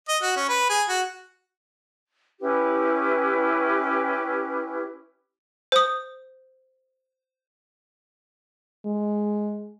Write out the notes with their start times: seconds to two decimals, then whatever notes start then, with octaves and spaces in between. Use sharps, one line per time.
0.08 D#5
0.22 F#4
0.36 C#4
0.49 B4
0.70 G#4
0.89 F#4
2.40 C#4 E4 G4 B4
5.72 C5 D#6
8.85 G#3